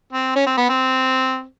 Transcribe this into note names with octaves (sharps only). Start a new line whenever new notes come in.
C4
C#4
C4
B3
C4